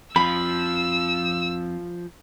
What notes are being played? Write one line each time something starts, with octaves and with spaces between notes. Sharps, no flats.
F2 F3 B5 E6